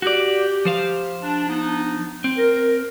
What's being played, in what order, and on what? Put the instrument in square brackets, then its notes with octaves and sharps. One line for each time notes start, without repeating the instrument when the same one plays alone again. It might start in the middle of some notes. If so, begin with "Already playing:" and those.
[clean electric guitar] F#4 D5 [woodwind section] G4
[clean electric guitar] F3 C5 F5
[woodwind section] D4
B3 D4 D#4
[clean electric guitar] C4
[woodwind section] A#4